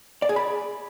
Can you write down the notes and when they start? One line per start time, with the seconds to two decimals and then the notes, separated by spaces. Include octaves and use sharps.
0.22 D5
0.29 G#4
0.36 B5